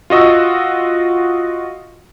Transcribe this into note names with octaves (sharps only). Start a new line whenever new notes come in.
F4 F#4 D#5 C#6 E6